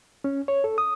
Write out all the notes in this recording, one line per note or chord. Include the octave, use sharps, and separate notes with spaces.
C#4
C#5
A4
D#6